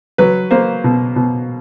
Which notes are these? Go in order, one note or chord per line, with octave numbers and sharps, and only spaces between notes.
F#3 B4
A#3 C5
B2
B2